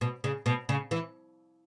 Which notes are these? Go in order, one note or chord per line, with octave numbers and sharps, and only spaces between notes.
B2
C#3
B2
C#3
E3